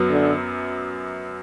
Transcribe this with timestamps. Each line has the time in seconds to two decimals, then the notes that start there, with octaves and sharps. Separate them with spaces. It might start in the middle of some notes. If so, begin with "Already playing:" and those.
Already playing: F#2 F#3 B3
0.10 D3